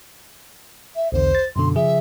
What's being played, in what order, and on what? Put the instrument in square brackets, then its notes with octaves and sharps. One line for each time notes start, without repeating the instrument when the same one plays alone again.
[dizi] E5
[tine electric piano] B1 E2 D3 [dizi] C5
[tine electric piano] A6
[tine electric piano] F#2 B2 D3 [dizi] C6
[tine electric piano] C#3 F3 G#4 [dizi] E5